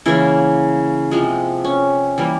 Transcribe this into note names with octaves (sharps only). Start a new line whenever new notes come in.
C#3 E3 A#3 E4
C3 F3 G#3
C#4
E3 G3 A#3